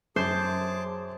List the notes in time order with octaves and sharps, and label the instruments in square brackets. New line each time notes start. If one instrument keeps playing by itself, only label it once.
[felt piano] F#2 [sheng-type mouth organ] G#4 A5 D6 [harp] C5